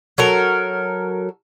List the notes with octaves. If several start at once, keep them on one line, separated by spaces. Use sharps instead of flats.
F#3 A4 A#4